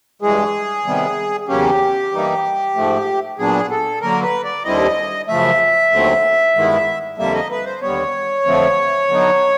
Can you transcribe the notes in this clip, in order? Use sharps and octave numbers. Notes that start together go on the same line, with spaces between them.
G2 E3 G#3 G#4
C3 D#3 G3 B3
E2 C#3 F#3 A#3 C#4 G4
G2 E3 G3 A#3 D#4
G#2 F3 A3
A#2 F#3 B3 D4 G#4
A4
D3 F#3 A#3 A#4
B4
D5
D#2 D3 G3 C4 E4 D#5
F#2 C#3 F3 A3 E5
D#2 D3 F#3 A3 C4
G2 D#3 G#3 B3 E4
F2 D3 G3 A#3 E5
D#5
B4
C5
D#2 D3 G3 B3 C#5
F2 D3 F3 A3 C4
D3 F#3 B3 D#4